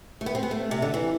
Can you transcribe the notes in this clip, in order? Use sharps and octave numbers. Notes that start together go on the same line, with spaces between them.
A3
B3
C4
B3
A3
C3
D3
E3